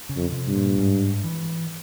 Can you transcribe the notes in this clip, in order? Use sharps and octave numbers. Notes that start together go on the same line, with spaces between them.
C#3
F2
C3
G2
A#2
G#2
E3